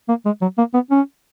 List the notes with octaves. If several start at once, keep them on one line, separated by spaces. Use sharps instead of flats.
A#3
G#3
F#3
A#3
B3
C#4